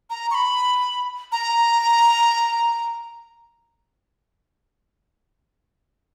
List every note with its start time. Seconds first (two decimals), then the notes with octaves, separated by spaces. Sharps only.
0.10 A#5
0.31 C#6
0.35 B5
1.32 A#5